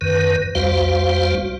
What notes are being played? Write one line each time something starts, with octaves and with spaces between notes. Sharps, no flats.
F#2 D#3 B4
C2 F2 G3 F#4 C5 F5